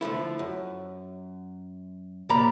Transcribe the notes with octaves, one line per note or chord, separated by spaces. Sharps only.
D3 F3 A3 E4
F#2
A#2 F3 G3 A#4 A#5 B5